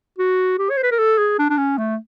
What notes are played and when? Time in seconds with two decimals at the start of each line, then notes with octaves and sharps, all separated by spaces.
0.18 F#4
0.58 G4
0.70 C#5
0.77 C5
0.83 B4
0.91 A#4
0.99 A4
1.18 G#4
1.39 D4
1.50 D4
1.58 C#4
1.78 A3